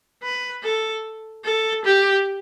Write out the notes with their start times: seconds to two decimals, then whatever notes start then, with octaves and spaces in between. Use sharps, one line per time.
0.23 B4
0.64 A4
1.45 A4
1.85 G4